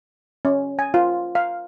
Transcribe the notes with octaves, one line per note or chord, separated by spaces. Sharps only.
C#4
G#5
F4
F5